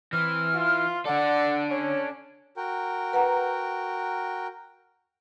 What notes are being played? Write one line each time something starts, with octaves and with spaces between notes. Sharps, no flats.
E3 C4 F6
F4
D4 A4 D5 F#5
C#4 C#5
F#4 A#4 G5
B4 F#5 A#5